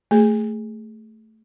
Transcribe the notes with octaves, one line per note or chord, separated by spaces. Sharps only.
A3 G#4